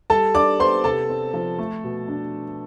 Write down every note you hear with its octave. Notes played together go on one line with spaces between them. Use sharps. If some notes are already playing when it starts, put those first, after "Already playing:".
G3 A4 A5
D4 D5 D6
B3 C5 C6
C3 A4 A5
C4
F3
A3
B2
D4